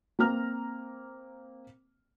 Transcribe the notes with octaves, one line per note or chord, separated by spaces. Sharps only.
A#3 C4 A#5 F6